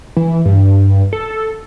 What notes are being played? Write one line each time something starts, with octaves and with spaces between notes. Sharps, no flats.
E3
G2
A4